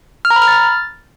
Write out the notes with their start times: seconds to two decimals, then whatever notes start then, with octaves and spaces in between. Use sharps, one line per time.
0.25 F6
0.30 A#5
0.36 B5
0.42 F6
0.48 A6